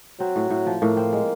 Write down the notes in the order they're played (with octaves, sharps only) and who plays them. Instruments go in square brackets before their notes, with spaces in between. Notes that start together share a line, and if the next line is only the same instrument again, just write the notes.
[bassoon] F#3 [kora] C4
[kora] A2
A2
F3
[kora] A2 [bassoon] A#3
[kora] C4
G#3